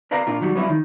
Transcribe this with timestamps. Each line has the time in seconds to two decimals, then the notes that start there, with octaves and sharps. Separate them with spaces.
0.11 A#4 B4 D5 F5 A#5
0.27 A#2 D4 F4 A#4
0.41 D#3 F#3 G3
0.55 F#3 G3 B3 C#4 E4 F4
0.69 D#3